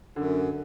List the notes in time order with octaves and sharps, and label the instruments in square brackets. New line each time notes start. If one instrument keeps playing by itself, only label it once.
[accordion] F#2 [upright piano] D3